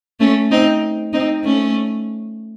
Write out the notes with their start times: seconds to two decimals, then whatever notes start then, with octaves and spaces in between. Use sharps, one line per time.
0.20 A3 C#4
0.51 C4 D#4
1.13 C4 D#4
1.44 A3 C#4